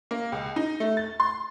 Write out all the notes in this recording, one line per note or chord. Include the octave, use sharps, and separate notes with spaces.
A#3
C#2
D#4
A3
A6
C6